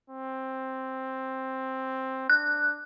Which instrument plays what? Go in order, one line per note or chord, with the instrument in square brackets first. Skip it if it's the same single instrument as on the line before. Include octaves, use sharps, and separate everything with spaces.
[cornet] C4
[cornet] D4 [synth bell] F#6